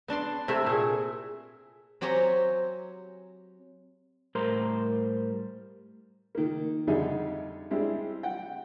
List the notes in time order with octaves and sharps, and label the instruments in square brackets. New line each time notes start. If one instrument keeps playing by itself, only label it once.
[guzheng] B3 D4 D5 C6
C3 A3 E4
A#2 G#4
F#3 C4 G4 C#5 G#5 A#5
[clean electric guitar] A2 G3 A#4 C5 A#5 C6
[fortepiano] D#3 A#3
F2 D3 G3 D#4 G#4 E5
G3 G#3 C4 D4 E4
F#5 G5